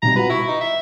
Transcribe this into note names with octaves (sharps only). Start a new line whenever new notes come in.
B1 C3 G3 A#5
F4 F#4 B4 F#5
E4 C#6
D#4
E5